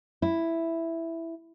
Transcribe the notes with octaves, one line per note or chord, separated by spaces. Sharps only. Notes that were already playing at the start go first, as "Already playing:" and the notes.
E4